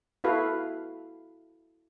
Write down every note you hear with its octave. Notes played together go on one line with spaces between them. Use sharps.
E4 F#4 A4 B4 F5